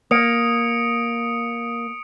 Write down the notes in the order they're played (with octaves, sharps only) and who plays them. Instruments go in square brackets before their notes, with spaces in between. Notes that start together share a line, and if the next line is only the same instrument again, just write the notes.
[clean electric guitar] A#3 [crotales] D#6 C#7 D7